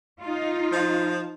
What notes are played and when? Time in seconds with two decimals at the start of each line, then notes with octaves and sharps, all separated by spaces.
0.21 D#4 F4
0.72 F3